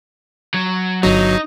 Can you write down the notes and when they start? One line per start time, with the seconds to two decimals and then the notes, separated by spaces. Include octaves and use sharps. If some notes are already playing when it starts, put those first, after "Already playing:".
0.54 F#3
1.03 G1 F#3 D#4